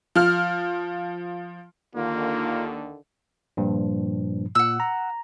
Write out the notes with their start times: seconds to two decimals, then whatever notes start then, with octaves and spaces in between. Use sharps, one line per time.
0.15 F3 F6
1.95 D#2 D3 D#3 A#3 F4
3.57 G2 A#2 F3
4.55 A#2 F#5 E6
4.80 A#5